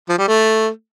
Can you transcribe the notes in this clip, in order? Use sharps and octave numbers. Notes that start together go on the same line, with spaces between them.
F3
G3
A3